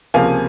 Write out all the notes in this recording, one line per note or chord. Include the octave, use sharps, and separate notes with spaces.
C#2 C3 F3 A#3 F5 G#5